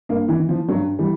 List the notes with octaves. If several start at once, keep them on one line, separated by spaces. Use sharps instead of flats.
G2 A#3
E3
E3
F3
G2 F#3
E3 G3